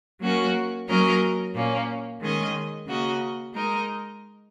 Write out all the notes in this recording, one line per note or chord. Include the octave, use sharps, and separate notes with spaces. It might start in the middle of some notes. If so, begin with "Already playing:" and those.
F#3 A#3 C#4 F#4 A#4
F#3 A#3 C#4 A#4 D#5
A#2 A#3 C#4
D#3 G#3 C#4 G#4 D#5
C#3 A#3 F#4 D#5
G#3 D#4 A#4 D#5